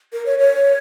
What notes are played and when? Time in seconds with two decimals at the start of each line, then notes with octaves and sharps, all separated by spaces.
0.13 A#4
0.26 C#5
0.39 C#5